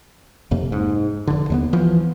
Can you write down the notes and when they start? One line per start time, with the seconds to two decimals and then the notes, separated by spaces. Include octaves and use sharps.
0.51 F1 F2 C3 A#3
0.72 G#2
1.27 F1 D3
1.50 D#2 G#3 B3
1.73 E3 F3